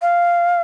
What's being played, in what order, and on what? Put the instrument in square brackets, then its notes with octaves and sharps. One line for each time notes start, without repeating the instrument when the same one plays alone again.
[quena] F5